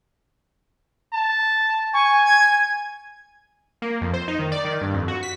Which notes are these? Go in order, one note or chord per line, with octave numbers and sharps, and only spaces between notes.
A5
G#5 C#6
G#6
A#3
F2
C5
D#4
D#3
D5
D#3
G2
F2
F#4
B6